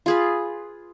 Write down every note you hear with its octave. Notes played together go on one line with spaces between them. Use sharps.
F4 G#4 B4